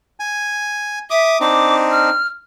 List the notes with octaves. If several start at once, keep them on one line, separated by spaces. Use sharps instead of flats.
G#5
E5 D6 D#6
C4 D4 D#4 D6
F6